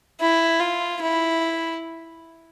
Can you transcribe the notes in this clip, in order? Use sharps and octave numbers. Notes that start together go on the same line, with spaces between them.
E4
F4
E4